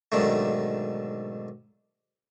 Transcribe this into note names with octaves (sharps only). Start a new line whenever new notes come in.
B1 G#2 D3 D#3 A3